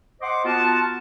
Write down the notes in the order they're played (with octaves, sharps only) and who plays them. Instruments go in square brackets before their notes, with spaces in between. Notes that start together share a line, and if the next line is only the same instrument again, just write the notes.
[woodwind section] C5 D#5 F#5 C6 D6
B3 F4 F#4 A#4 F#5 A5